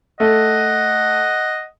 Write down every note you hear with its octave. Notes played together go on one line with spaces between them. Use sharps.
A3 D#5 F#5